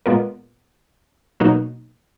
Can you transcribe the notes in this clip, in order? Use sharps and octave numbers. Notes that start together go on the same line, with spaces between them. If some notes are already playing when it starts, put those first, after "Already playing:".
A#2 G#3 B3 F4 A#4
B2 F#3 A#3 D#4 F#4